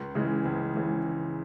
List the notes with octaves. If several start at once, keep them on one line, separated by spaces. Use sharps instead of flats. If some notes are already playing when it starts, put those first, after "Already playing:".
Already playing: C#2
C#3 E3 G#3
C#2
C#3 E3 G#3